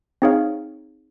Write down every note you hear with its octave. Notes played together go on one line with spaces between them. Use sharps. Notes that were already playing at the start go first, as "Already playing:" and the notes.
C4 D#4 G#4 C#5 F5